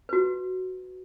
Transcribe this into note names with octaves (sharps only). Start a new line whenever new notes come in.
F#4 B4